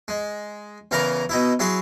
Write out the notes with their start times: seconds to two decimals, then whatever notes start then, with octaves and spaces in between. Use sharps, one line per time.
0.08 G#3
0.91 E2 C#3 E3 A#4 A#5
1.29 B2 D#4 E4
1.59 F#3 E4 G#4 C6